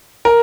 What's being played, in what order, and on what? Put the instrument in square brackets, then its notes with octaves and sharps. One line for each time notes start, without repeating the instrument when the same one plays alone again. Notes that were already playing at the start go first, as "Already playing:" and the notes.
[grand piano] A#4